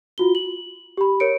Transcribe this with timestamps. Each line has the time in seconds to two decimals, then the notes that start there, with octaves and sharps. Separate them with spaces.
0.18 F4 F#4 G7
0.35 F#7
0.97 G4 B5
1.20 A#4 C#5 C#7 D7